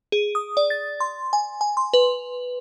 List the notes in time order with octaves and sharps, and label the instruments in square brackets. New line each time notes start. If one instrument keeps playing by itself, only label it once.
[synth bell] G#4
D#6
D5
A6
C6
G#5
G#5
C6
B4